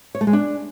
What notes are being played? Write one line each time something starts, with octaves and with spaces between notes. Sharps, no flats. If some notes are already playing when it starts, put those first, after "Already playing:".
C#5
A3
G#3
D4